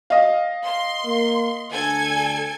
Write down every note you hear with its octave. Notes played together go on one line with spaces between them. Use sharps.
D#5 F5
C6
A#3
D2 D3 A4 G#5 G#6